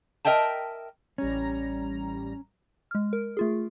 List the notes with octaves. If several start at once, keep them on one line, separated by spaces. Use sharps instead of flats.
A#4 D#5 E5 G5 A5
A1 G3 C#4 A#5
G#3 F6
A#4
A3 F4 G#4